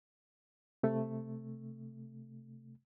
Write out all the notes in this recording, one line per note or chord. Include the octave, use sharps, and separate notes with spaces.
C3 A3